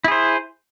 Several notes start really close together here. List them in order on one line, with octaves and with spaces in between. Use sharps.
E4 G#4 C5